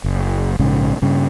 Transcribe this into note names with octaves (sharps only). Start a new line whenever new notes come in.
F#1
A#1 G#2 C#3
G2 C#3